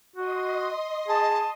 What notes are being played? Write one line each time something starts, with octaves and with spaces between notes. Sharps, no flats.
F#4 D#5 C6 D#6
G#4 A5